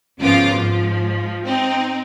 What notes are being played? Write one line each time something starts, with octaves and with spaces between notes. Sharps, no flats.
G#1 C#3 F3 B3 F4 D6
G#2 F3
C4 D#4